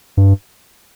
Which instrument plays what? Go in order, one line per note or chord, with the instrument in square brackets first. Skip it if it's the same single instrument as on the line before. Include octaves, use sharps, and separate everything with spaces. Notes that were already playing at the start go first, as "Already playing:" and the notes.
[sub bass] G2